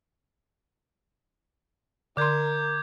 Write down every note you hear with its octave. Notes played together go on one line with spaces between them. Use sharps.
D3 A#4 C6 D6 G6 G#6